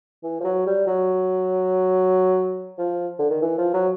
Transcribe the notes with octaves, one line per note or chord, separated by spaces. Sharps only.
E3
F3
F#3
G3
F#3
F3
D3
D#3
E3
F3
F#3